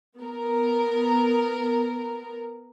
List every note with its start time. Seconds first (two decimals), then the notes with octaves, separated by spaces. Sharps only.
0.18 B3 A#4